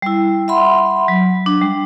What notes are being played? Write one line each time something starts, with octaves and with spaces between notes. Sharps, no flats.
G3 E4
E5 F#5 B5 C6
F#3
D4
G3